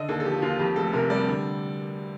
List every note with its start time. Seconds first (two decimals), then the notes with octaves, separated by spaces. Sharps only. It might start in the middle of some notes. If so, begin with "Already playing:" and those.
Already playing: D3 D#5
0.08 D#2 A4
0.20 A4
0.25 F3 G4
0.42 D#2 F4
0.59 F2 G4
0.76 F1 A4
0.93 C3 A#4
1.10 G3 D5
1.27 D3